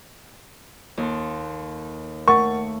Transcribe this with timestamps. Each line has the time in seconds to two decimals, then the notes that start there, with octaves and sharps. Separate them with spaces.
0.97 D#2 A4 C6
2.28 A3 A#4 F#5 C#6 A6